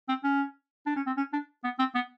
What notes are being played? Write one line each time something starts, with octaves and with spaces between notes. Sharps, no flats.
C4
C#4
D4
C#4
C4
C#4
D4
B3
C4
B3